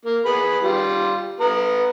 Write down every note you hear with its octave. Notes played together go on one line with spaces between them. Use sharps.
A#3
B3 G#4 B5
G3 F4
B3 A#5